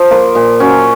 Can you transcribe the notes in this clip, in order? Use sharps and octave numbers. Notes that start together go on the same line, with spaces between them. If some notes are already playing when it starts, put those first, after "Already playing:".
Already playing: F3
A#3 F4 A#4
A#2
F#3 C#4